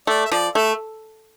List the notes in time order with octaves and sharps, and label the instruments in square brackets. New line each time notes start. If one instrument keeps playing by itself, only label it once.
[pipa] A3 [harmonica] D5
[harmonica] E5
[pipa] F3 [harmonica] D5
[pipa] A3 [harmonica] E5